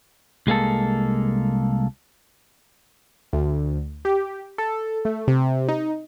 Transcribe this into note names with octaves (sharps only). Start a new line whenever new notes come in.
C2 G#3 A#3 A4
D2
G4
A4
A3
C3
D#4